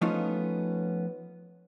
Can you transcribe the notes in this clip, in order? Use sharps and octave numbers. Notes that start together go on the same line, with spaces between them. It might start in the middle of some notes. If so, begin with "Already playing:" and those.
F3 A3 B3 C#4 D#4 F4